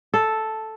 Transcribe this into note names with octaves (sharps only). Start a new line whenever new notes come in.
A4